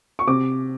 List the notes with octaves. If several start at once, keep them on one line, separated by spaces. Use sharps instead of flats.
C#6
C3 D6